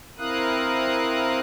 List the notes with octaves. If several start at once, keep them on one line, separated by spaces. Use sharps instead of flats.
C4 E4 A#4 F5 D#6 F#6